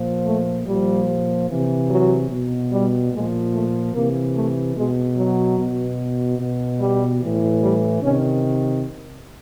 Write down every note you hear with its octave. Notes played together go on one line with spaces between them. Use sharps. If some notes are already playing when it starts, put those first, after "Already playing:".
Already playing: A#2 F3
A3
A#2 F3 G3
C3 E3
F#3
B2
G3
A#2 F3 G#3
A3
C3 E3 A#3
A3
B2 G#3
F#3
B2
B2
G3
A2 E3
G3
C3 D#3 C#4